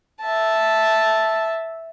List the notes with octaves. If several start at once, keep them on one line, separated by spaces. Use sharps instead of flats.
E5 A5